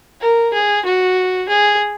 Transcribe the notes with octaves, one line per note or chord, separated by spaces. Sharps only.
A#4
G#4
F#4
G#4